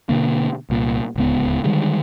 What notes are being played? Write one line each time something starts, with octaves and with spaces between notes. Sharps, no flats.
B2 D3 A#3
C2 A#2
D1 C#2 B3
D3 D#3 G3 G#3